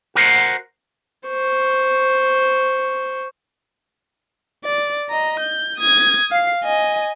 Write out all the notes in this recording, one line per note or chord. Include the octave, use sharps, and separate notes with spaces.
F#4 A#4 C5 F#5
C5 C#6
D5
D#5 A#5
G6
D#6 G#6
F5 C7
D#5 G#5